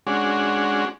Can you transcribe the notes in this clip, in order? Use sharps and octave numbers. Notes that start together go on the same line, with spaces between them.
G#3 C#4 D4 F#4